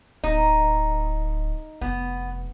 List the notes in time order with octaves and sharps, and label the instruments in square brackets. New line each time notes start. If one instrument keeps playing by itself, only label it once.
[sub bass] D1 [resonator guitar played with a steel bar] D#4
[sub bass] F1 [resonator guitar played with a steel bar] B3